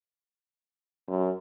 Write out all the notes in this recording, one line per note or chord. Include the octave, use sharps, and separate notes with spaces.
F#2